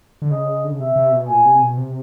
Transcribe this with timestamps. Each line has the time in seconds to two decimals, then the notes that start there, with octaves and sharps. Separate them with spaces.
0.22 D3
0.31 C#3 D#5
0.64 D3
0.72 C#3
0.80 C3 E5
0.96 C3
1.12 B2
1.29 A#2 G#5
1.45 C3
1.62 B2
1.77 C3